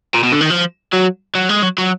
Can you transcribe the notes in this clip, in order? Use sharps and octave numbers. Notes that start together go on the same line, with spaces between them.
A#2
B2
D3
D#3
F3
F#3
F#3
G#3
F#3
F#3